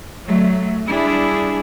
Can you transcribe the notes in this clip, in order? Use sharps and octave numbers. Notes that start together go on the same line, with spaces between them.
F#3 A3
G3 D4 E4 G#4